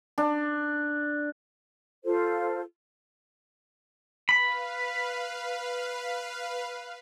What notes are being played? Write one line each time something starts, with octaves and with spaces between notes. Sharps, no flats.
D4
F4 A4 C5
B4 F5 B5